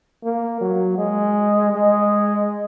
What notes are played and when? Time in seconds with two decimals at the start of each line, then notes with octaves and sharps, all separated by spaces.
0.23 A#3
0.61 F#3
0.98 G#3
1.72 G#3